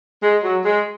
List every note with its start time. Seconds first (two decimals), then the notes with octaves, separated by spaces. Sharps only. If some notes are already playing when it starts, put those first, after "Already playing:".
0.21 G#3
0.42 F#3
0.64 G#3